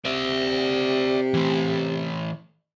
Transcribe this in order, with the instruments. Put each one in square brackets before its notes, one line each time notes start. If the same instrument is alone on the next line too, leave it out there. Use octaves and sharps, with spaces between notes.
[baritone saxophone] C3 [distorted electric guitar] D5 E5
[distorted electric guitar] E3 A3